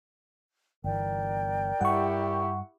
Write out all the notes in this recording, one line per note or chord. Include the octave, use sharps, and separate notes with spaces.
G1 E3 A#4 D5 G5
G2 G3 E4 G4 F#5 C#6